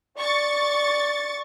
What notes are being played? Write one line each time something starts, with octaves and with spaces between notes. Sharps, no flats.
D5 C#6 A6